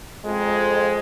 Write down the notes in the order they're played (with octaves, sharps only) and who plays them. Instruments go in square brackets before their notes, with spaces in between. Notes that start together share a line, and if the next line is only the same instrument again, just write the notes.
[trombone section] F2 [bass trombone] G#3